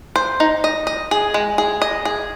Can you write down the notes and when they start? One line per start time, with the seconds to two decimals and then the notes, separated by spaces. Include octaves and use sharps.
0.16 C5
0.40 D#4
0.64 D#5
0.87 D#5
1.11 G#4
1.34 G#3
1.58 G#4
1.82 D#5
2.05 G#4